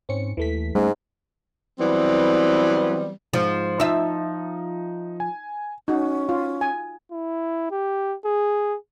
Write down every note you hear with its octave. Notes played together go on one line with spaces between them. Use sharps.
G#2 C4 C#4 C#7
D#2 E3 A3 B6
G#2 G3 A3 C#4
E3 F#3 G3 B3 C4
G#2 F3 C5
F3 D#4 E5
G#5
C#4 D#4 F#4
F4
G#5
E4
G4
G#4